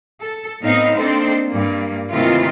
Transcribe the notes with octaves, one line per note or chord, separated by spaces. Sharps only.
A4
A2 B3 C4 D#4 F5
A#3 C4 D4 D#4 A4 C5
G2 A#3
C3 D#3 E3 A3 A#3 F4